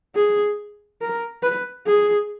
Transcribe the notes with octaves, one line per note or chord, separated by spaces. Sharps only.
G#4
A#4
B4
G#4